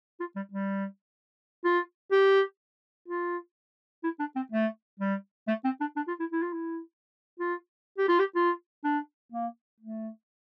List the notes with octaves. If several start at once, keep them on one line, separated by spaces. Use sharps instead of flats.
F4
G3
G3
F4
G4
F4
E4
D4
C4
A3
G3
A3
C4
D4
D4
F4
E4
E4
F4
E4
F4
G4
F4
G4
F4
D4
A#3
A3